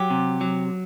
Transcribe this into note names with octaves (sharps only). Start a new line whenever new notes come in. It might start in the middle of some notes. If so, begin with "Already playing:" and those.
Already playing: F#3 G4
C3
F#3